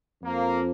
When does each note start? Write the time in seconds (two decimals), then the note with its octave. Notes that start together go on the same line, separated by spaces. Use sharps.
0.22 F2 F3 A#3